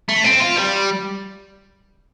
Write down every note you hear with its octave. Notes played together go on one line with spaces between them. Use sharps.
A3
C4
F4
G3